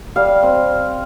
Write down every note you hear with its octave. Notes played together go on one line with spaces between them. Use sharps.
G3 F5
C4